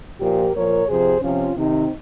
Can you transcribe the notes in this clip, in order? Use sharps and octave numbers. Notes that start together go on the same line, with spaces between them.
A#2 F3 G4 A#4
A#2 F3 A#4 C#5
C3 F3 G#4 C5
C3 F3 C#4 F4
C3 D#3 C4 D#4